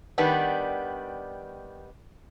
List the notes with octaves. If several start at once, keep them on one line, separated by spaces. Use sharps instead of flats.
D#3 G3 B3 D4